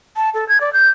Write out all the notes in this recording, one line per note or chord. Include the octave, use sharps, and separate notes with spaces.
A5
A4
G#6
D5
G6